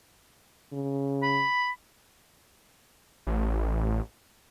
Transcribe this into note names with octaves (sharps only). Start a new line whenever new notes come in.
C#3
B5
A1